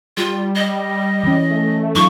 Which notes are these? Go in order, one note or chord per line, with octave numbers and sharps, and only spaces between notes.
G3 F4
D#5
E3 C#4
A3
F#3 D#4 F4 C#6